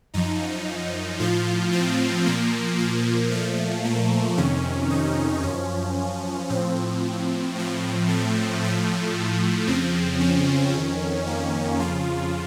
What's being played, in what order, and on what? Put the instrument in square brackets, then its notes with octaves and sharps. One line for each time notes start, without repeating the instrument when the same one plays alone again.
[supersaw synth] F#2 F3 D#4
A2 F3 F4
C4
A#2 F3 A#3
A#3
A#2 F3 A3
A#3
F2 C3 D#3 C#4
D#4
F#2 F3 C#4
A2 F3 C4
A2 F3
A3
A2 F3
F2 C#3 F3 C4
C#4
F2 D#3
A#3
F2 C#3 F3 F4